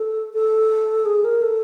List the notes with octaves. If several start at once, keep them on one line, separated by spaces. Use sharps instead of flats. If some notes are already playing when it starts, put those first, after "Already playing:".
Already playing: A4
A4
G#4
A#4
A4